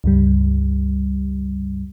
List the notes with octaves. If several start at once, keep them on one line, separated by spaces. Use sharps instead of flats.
C#2 G2 G3